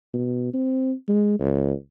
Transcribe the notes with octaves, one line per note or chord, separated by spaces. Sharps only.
B2
C4
G#3
C#2